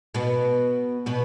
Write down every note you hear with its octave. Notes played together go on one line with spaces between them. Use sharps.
B2 B3
B2 B3